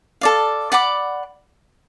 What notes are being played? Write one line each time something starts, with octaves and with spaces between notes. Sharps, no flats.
A4 D5 F5
D5 F#5 B5 D6